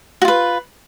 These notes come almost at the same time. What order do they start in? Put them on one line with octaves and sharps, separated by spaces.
F#4 F4 B4